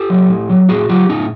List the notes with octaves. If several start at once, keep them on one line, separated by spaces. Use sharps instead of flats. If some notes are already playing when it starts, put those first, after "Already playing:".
Already playing: G4 A4
F#3
A2
F#3
A2 F#4 G#4
F#3 F4 G4
A2 C#4 D#4